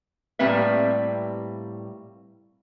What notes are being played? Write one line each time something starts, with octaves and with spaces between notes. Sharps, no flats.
A2 G3 A#3 C4 B4 E5